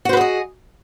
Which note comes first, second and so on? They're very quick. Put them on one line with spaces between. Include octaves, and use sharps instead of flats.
F#4 C5 B4 G#4 D#5